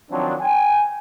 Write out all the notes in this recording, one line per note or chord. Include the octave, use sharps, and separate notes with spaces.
D#3 F3 F#3 C4 D4
G5 G#5